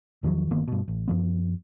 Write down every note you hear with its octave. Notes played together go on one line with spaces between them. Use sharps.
E2 D#3 F3 F#3
G1 D#3 A#3 B3
G2 B2
A1
F#2 F3 B3